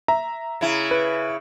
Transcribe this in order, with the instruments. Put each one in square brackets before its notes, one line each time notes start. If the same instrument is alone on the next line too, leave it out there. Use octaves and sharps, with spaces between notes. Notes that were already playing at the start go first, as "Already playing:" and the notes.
[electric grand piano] E5 A#5
[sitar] C#3 E4
[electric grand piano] B4